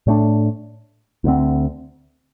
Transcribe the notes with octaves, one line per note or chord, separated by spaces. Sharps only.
A2 A3 D4
D2 D3 C4